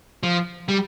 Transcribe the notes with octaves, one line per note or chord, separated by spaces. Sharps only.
F3
G3